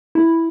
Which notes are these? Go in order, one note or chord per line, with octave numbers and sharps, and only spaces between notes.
E4